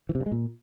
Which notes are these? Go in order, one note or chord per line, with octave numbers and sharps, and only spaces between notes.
E3
C3
G2
G#3
A#2